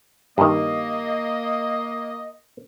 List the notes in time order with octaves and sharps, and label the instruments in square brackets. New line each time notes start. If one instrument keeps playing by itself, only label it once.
[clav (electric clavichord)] G2 D#3 [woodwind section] A#3 D#5